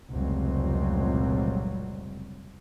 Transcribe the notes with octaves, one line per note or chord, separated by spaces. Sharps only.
F1 C#2 A#2 F#3 G3 C4